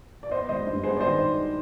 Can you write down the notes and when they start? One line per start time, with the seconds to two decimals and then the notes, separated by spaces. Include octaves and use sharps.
0.23 D5
0.31 B3 C5 D#5
0.49 G#3 C5 D#5
0.67 G2
0.83 B3 G#4 C5
0.97 D5
1.00 D#3 C5 D#5